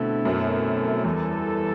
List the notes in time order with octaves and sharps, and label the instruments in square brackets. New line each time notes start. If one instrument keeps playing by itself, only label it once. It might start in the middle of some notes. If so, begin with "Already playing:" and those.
Already playing: [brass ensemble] B2 A3 C4 E4 A4 [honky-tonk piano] D3
[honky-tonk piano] F#2
[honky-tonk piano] E2 [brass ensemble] G3 B3 E4 A4